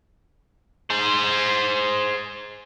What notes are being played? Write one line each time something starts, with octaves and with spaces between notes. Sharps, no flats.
G#4 C5